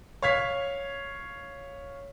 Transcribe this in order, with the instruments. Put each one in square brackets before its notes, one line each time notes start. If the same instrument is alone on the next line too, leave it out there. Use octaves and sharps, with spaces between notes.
[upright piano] C#5 F5 G#6 B6